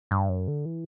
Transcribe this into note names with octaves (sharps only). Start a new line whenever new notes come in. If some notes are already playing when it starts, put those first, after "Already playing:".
G2
F#2
D3
E3